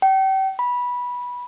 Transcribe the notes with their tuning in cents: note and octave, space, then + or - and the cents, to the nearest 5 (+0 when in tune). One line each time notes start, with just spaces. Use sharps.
G5 -35
B5 -15